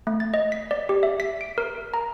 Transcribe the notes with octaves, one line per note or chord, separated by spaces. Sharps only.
A3
A6
D#5
B6
D5
G4
E5
B6
D7
A#4
A#5